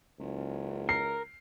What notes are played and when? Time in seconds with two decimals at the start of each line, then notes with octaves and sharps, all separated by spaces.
0.19 F#1 C#2
0.89 A#4 C7